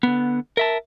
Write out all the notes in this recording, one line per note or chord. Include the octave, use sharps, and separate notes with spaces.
D3 B3
A#4 E5 A5